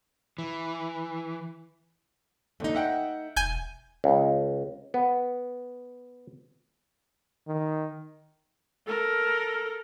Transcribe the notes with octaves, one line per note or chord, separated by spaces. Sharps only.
E3
D#2 D3 A3 D#4
E5 F#5 G5
E1 G#5 G6
C#2
B3
D#3
A4 A#4